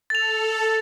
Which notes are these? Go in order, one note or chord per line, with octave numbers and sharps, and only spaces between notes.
A4 A6 F7